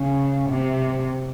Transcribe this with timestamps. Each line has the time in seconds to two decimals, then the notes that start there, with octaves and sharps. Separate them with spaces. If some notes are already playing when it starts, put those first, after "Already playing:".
Already playing: C#3
0.49 C3